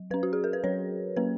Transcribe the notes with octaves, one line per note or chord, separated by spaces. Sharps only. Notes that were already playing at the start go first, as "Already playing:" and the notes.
Already playing: F#3
F#3 C#4 B4
F#4
G#4
A#4
B4
F#3 C#4 C#5
F#3 A#3 C#4 B4